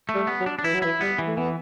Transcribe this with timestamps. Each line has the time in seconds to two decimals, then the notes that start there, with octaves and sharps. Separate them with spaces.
0.09 A3
0.15 G3
0.27 B3
0.40 F#3
0.46 D4
0.59 D4
0.63 E3 E4
0.74 F#3
0.82 E3 E4
1.01 G3 B3
1.19 E3
1.27 A3
1.37 E3 B3